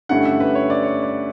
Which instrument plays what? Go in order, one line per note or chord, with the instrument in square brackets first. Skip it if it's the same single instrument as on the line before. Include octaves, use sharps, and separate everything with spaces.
[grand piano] G2 D3 A3 C#4 E4 F#5
E5
B4
C#5
D5
C#5
D5